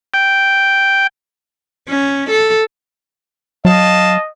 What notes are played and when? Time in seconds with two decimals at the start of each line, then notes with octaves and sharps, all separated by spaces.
0.14 G5
1.88 C#4
2.30 A4
3.65 F#3 D#5 F5 A5